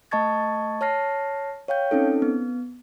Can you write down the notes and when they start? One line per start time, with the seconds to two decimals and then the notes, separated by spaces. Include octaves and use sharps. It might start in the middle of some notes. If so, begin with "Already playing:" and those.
0.11 A3 D#5 A5 C#6 G#6 A6
0.81 C#5 A5 F6 A#6 C7
1.68 C#5 F5 G5 G6
1.91 C4 C#4 D#4 A4
2.22 B3